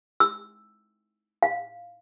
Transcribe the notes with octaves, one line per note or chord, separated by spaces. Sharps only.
E6
F5